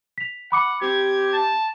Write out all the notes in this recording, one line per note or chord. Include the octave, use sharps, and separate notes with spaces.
B6 F7
F#5 B5 D6 C#7
C4 G4 G#6
A5